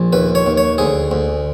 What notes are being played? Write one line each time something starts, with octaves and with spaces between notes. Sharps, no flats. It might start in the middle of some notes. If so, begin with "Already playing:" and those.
Already playing: A#1
D#2 B4
C#5
D#2
C#5
D2 G#4
D2